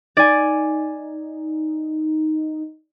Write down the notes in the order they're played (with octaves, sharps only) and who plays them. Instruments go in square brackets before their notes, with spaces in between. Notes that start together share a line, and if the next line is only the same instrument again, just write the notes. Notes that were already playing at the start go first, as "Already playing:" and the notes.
[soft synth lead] D#4 [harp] D5 G#5